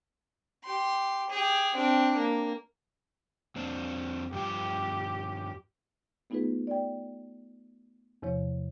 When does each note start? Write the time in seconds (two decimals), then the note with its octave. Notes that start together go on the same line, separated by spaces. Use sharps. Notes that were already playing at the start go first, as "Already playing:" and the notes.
0.64 G4 C6
1.30 G4 G#4
1.75 C4 D4
2.17 A#3
3.56 F2 C4 D4
4.32 G2 F3 G4 G5
6.30 A3 B3 D#4 F4 G#4 B4
6.67 D5 G5
8.22 E2 C3 F3 C#5